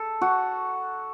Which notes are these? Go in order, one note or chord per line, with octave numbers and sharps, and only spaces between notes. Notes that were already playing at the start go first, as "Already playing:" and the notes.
Already playing: A4
F#4